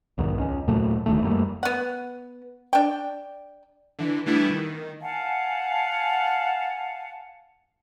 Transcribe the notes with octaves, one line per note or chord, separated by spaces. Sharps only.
B1 E2 G#2 D#3
C#2 C#4
D#2 A#2 F#3 A3
E1 D2 D#3 A3
F#2 G3 A3 A#3
B3 F#5
D4 G5
D3 E3
E3 G3 A3 B3 D4 E4
D#3
F5 F#5 G#5 A5